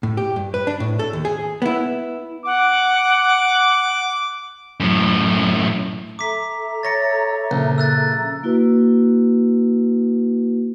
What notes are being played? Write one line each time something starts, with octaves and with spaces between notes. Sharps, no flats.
A2
G4
G2
B4
D4
A2
A4
D#2
G#4
B3 E4
F#5 D6
F#2 A2
A4 E5 A#5 D6 B6
C#5 A6 A#6 C#7
A#1 C#3
E6 F#6 A6
A#3 E4 F#4 B4